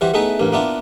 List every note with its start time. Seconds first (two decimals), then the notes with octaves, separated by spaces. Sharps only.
0.01 E3 G3 F#4 C5
0.14 A3 B3 D#4 E4 G#4 B4
0.39 A1 G2 A#3
0.52 A#3 B3 D4 E4 F4